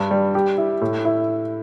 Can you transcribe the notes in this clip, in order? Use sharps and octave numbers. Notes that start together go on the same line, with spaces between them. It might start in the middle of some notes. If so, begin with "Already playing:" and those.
Already playing: G2
G3
G4
E4
A2
E4